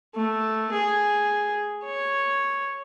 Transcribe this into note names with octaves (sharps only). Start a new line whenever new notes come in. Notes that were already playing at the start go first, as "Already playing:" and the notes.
A3
G#4
C#5